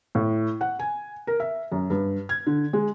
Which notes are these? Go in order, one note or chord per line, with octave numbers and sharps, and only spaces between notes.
A2
F#5
G#5
A#4
E5
F#2
G2
G#6
D3
G#3